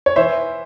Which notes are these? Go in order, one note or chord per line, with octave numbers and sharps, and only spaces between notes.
C#5
E3 C5 E5